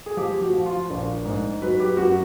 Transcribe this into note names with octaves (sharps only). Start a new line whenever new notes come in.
G#4
F3 G4
F#4
F3
F4
A#1
G#2
F#3 B4
G4
F#2 F#4